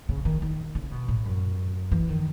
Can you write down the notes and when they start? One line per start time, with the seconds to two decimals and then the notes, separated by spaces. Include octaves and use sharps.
0.09 C#3
0.25 D#3
0.42 D#3
0.75 C#3
0.91 B2
1.08 A2
1.25 F#2
1.91 E3
2.09 D#3